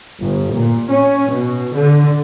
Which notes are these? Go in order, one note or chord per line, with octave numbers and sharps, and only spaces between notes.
G1
A#2
C#4
B2
D3